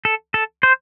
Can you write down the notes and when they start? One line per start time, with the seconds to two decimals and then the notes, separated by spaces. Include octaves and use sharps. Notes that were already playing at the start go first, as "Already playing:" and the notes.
0.05 A4
0.34 A4
0.63 C5